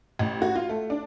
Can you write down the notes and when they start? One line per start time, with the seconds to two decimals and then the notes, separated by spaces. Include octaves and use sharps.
0.19 A1
0.42 F#4
0.56 F4
0.69 A3
0.90 D4